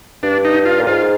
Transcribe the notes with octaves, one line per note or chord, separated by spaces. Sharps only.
G2 D4
D#4
F4
A#2
G#2 F4